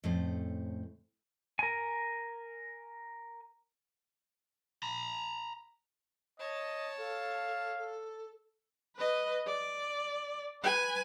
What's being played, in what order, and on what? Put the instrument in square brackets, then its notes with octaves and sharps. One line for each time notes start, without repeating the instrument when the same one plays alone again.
[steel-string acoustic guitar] F2 A2 C#3 A3 C5
[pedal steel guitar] A#4 G#5
[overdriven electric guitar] A#5 B5
[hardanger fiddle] C#5 A5 [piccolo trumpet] D#5
[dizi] A4 [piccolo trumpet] F5
[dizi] A4
[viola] B4 D#5
D5
B4 G#5